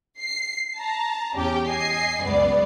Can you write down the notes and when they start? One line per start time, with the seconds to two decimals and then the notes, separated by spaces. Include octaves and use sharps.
0.18 C7
0.77 A5 A#5
1.33 E2 C#4 G4 G5
1.67 D#5 G#5 C7
2.22 C#2 F#2 B3 D5